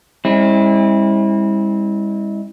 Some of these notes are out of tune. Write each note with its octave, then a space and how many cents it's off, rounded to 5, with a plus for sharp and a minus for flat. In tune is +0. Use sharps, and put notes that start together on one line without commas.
G#3 -45 C4 +40 E4 -25